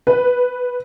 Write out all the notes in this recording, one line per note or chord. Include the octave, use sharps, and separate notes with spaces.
B4